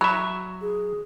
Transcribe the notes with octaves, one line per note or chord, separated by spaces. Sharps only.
F#3 E5 B5
G#4